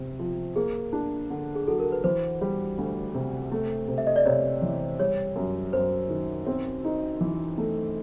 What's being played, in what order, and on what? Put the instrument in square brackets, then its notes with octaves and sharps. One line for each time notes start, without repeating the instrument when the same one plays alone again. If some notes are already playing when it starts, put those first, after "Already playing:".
Already playing: [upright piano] C3
F3
[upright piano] A#3 [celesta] G#4
[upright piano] D4
D3
[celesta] G#4
[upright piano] F#3 [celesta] A4
[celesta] A#4
B4
[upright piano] E3 [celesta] C5
[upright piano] G3
D2
C3
A3
C3
[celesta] E5
D#5
D5
[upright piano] C3 [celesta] C#5
[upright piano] E3
[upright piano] G3 [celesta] C#5
[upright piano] F#2
[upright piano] F#2 [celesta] C5
[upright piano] D#3
C4
D#4
E3
A3